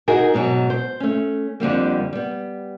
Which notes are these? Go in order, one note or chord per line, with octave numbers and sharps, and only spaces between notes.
D#4 F#4 G#4 A#4
G#2 B2 D3 F#3
C5
A3 C#4
F2 D3 G3 A#3
G3 B3